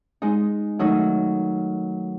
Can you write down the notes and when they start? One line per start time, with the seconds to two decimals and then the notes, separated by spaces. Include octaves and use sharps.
0.22 G#3 D#4
0.79 D#3 F#3 A3 D#4